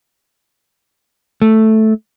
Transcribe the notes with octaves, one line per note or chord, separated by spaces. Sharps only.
A3